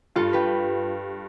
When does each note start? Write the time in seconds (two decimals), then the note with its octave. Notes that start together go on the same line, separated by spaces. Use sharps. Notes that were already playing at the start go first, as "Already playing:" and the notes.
0.16 G2 F4 A4
0.33 G4 B4